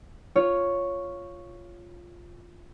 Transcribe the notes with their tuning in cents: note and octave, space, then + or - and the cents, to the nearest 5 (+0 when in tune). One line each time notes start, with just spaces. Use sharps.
F4 +0 C#5 +0